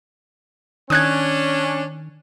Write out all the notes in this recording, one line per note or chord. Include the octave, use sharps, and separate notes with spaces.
D#3 C#4 D4 D#6 F#6 G#6